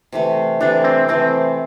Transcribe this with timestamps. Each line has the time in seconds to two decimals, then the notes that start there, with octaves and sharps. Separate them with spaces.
0.12 C3 E3 A3
0.60 C3 E3 A3 D4
0.84 C4
1.08 C3 E3 A3 C4